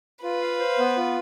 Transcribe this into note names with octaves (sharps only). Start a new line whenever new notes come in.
F4 B4
F5
C5
B3
F4